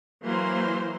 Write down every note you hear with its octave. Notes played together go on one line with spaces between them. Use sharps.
E3 F#3 A#3 C5 C6